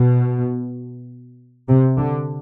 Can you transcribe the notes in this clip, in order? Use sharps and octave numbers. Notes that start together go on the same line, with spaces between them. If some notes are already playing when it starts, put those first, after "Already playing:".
Already playing: B2
C3
D3